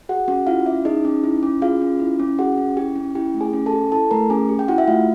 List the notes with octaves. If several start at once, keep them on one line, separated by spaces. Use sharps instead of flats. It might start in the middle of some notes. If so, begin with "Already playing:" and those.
F#4 G#4 F#5
C#4 F#4 F#5
E4 F4 F5
C#4 E4 E5
D#4 G#4 D#5
C#4
E4
C#4
F4 G#4 F5
C#4
E4
C#4
F#4 G#4 F#5
C#4
E4 G4 G5
C#4
E4 G4 G5
A3
G#4 G#5
C#4
A4 A5
G4
E4 A4 A5
A3 A#4 A#5
C#4 G#4 G#5
G4
G5
E4 F#4 F#5
E5
A3 F4 F5